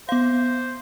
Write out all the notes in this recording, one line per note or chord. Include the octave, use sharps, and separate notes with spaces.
B3 C5 F5